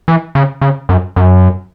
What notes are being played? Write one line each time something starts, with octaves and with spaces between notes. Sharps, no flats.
E3
C#3
C#3
F#2
F#2